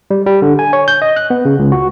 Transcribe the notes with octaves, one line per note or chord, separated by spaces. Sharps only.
G3
G3
D3
G#5
C#5
G6
D#5
F#6
B3
C#3
C#2
F#4